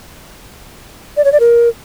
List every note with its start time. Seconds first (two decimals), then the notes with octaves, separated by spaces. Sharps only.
1.17 D5
1.25 C#5
1.32 D5
1.40 A#4